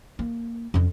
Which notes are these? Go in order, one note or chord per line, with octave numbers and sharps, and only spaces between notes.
A#3
F2 C#4